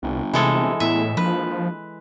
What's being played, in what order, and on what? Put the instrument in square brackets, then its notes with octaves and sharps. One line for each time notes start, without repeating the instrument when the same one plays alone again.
[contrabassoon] G1 [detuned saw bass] C2
[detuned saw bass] C3 [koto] E3 G#3 A4
[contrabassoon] E2 [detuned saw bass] A2 [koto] E5
[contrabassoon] A#1 [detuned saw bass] F3 [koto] B4